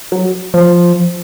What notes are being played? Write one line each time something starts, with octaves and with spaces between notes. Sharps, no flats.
F#3
F3